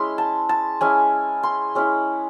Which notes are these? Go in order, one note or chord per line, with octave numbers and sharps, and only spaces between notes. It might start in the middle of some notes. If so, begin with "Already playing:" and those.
Already playing: G#3 C#4 E4 C6
A5
A5
G#3 C#4 E4 G#5
C6
G#3 C#4 E4